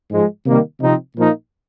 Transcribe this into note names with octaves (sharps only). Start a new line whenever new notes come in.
G#2 F3 G#3
C3 D#3 G3 A#3
C3 F3 C4 D#4
A#2 F3 A#3 D#4